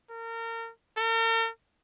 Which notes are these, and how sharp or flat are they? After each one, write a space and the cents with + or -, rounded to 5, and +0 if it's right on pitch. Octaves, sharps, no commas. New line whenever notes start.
A#4 -30
A#4 -45